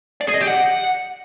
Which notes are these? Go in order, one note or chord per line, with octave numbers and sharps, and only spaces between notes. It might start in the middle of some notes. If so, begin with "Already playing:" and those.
D5
G#4
D#5
G4
F#5